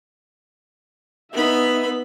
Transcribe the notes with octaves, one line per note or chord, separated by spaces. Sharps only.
B3 D#4 E5 B5